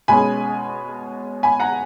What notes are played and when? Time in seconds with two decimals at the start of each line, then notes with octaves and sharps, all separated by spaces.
0.08 B2 G#3 C#4 G#5 B5
1.43 G#5 B5
1.60 F#5 A#5